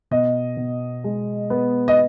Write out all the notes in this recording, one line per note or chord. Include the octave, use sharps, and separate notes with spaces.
B2 D#5
B2
G#3
B3
D#5